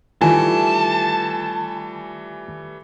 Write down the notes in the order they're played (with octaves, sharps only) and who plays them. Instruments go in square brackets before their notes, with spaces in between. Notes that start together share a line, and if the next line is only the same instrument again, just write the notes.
[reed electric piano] D#3 F4 [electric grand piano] E3 G3 A3 [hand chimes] G#5 [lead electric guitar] A5